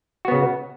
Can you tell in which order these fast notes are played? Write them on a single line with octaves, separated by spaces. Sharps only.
F#4 B3 C#3